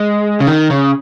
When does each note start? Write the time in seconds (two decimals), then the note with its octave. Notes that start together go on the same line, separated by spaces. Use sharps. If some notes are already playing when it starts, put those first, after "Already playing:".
Already playing: G#3
0.40 C#3
0.47 D#3
0.70 C#3